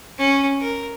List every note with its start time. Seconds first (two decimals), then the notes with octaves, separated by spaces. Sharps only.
0.18 C#4
0.60 A#4